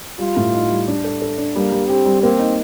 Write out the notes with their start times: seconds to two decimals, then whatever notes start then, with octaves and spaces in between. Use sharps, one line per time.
0.19 G3 F4
0.37 A2
0.54 D#4
0.70 G3
0.88 D4
1.04 A4
1.22 A4
1.38 D4
1.55 G3 A#3
1.72 G3
1.89 C4 G4
2.05 G3
2.22 A#3 C4
2.39 D#4